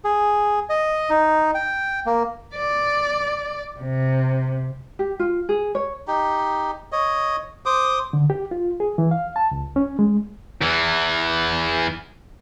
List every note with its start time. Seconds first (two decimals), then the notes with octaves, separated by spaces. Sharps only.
0.05 G#4
0.70 D#5
1.10 D#4
1.55 G5
2.06 A#3
2.54 D5
3.80 C3
4.99 G4
5.19 F4
5.49 G#4
5.75 C#5
6.08 D#4 G4
6.92 C#5 D#5
7.66 C5 D6 D#6
8.13 D3
8.30 G4
8.51 F4
8.80 G#4
8.98 E3
9.11 F5
9.36 A5
9.51 C#2
9.76 C#4
9.99 G#3
10.62 E2 E3